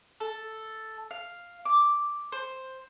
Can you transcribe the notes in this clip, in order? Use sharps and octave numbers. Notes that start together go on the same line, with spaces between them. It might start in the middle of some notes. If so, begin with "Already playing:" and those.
A4
F5
D6
C5